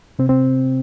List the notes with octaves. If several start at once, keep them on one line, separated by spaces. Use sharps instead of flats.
C3 C4
C4